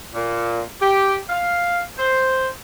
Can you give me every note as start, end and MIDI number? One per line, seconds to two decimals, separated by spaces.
0.13 0.61 46
0.81 1.15 67
1.29 1.79 77
1.98 2.47 72